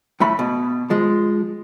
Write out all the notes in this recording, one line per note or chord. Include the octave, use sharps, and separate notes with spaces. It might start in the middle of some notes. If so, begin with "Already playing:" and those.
A2 A3 B5
B2
F3 G#3